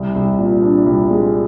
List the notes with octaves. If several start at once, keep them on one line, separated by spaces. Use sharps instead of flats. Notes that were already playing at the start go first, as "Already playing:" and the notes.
Already playing: C2
C2
A#2
D4
C2
G#3